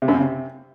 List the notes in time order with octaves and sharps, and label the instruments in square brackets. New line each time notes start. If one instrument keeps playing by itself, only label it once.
[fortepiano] C3
F#2
C#3
C3